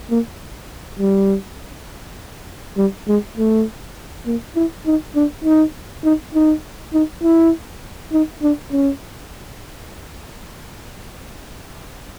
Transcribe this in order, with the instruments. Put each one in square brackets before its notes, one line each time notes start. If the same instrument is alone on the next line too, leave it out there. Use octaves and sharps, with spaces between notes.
[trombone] A#3
G3
G3
G#3
A3
A#3
E4
D#4
D4
D#4
D#4
D#4
D#4
E4
D#4
D4
C#4